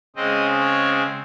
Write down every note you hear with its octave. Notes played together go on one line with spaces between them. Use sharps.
C#3 G#3 C4 D#5
C#5